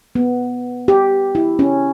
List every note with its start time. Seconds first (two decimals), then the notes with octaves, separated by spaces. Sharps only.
0.15 B3
0.88 G4
1.35 E4
1.59 C#4